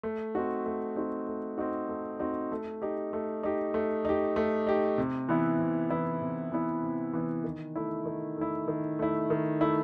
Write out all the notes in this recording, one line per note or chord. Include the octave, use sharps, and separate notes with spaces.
A3
C4 D#4 F#4
A3
C4 D#4 F#4
A3
C4 D#4 F#4
A3
C4 D#4 F#4
A3
D#4 G4
A3
D#4 G4
A3
D#4 G4
A3
D#4 G4
C3
E3 B3 E4
C3
E3 B3 E4
C3
E3 B3 E4
C3
E3 B3 E4
D#3
A3 E4
D#3
A3 E4
D#3
A3 E4
D#3
A3 E4